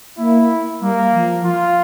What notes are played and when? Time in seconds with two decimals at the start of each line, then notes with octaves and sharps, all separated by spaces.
0.18 A#3 E4
0.81 G3 A#3
1.13 F3
1.45 F4